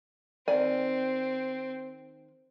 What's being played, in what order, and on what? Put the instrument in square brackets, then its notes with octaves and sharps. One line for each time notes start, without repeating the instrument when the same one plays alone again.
[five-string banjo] D#3 D5 G#5 [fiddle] C4